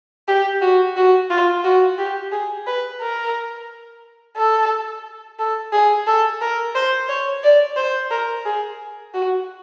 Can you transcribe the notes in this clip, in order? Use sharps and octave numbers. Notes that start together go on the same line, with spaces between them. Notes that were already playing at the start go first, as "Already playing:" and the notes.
G4
F#4
F#4
F4
F#4
G4
G#4
B4
A#4
A4
A4
G#4
A4
A#4
C5
C#5
D5
C5
A#4
G#4
F#4